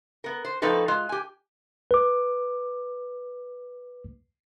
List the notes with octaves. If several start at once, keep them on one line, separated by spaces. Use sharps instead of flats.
B3 A#4
C5
F3 A3 C4 D#4 A4 B4
G#3 F4
G4 G#5
B4 D6